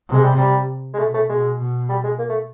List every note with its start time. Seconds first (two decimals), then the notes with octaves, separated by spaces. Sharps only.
0.09 C3
0.14 G#3
0.23 G3
0.38 G3
0.94 G#3
0.99 B2 A3
1.14 A3
1.29 B2 G#3
1.59 B2
1.89 G3
2.04 G#3
2.19 A#3
2.29 A3